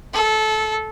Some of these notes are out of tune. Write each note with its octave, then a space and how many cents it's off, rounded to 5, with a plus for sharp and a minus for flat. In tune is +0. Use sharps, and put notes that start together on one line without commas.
A4 -20